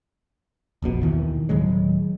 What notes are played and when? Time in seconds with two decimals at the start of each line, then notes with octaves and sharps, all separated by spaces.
0.82 E1 A#1 B2
1.03 D#2 B2 D#3 E3
1.49 D1 D#3 F#3 G#3